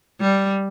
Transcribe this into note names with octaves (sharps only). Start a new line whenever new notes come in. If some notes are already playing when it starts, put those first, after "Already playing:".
G3